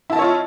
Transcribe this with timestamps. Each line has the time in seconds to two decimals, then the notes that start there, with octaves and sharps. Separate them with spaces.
0.10 E4
0.13 A5
0.16 D#5
0.19 C#5
0.22 F4